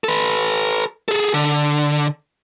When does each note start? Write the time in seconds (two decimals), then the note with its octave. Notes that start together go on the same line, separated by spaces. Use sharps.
0.04 A4 B4
1.09 G#4 A4
1.34 D3